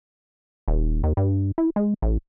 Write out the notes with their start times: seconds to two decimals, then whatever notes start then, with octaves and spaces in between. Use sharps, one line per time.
0.68 D#1
1.03 D#2
1.17 G2
1.58 E4
1.76 G#3
2.02 A1